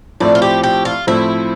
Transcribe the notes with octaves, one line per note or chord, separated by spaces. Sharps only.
A2 F3 C4 D4
F4
G4
G4
F4
A2 F3 C4 E4